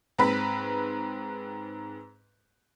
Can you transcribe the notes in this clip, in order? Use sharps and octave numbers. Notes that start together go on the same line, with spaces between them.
G#2 C4 B4 B5 B6